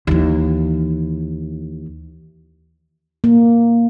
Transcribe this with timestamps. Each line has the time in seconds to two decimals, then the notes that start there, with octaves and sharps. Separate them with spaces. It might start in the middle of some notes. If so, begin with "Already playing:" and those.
0.07 D#2 E3
3.24 A#3